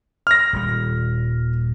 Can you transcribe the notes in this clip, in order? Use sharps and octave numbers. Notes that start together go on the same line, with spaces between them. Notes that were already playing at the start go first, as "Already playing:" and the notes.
F6 A#6
D#1 G3